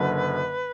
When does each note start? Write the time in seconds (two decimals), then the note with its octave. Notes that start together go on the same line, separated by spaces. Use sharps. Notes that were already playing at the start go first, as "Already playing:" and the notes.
Already playing: F#1 F#2 D3 B4